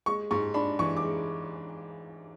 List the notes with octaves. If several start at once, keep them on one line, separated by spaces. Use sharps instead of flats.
G#3 C#6
G#2 C#6
D4 B5
E3 C#6
D6
G#3